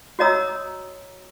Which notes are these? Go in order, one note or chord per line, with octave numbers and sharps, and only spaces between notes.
F#4 C#5 D#5 A#5 D#6 E6